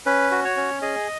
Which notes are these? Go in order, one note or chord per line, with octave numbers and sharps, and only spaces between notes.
C#4 B4
F#4
C#5
C#4
G#4 D#5